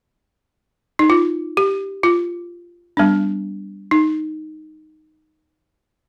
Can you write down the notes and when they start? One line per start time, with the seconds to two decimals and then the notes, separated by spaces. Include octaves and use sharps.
0.99 D#4
1.10 F4
1.57 G4
2.03 F4
2.97 G3 B3 D4
3.91 D#4